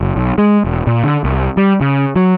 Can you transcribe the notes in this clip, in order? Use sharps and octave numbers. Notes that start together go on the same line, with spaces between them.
F#1
B1
G#3
E1
A#2
D3
C2
G3
C#3
F#3